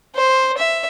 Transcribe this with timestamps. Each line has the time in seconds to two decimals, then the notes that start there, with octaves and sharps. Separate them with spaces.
0.16 C5
0.58 E5